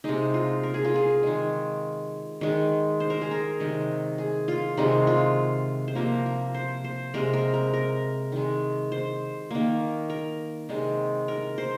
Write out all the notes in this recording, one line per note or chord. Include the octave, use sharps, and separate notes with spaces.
C3 G#3 D#4
F4
A#4
G#4
F4
G#4
D#3 G#3
D#3 G#3
C5
A#4
G#4
A#4
C3 D#3 G#3
G#4
F4
C3 D#3 G#3 D#4
F4
C5
C3 F3 A#3 A#4
A#4
C5
C5
C3 G#3 A#4
A#4
A#4
A#4
D#3 G#3
C5
D#3 A#3
A#4
C3 D#3 G#3
A#4
C5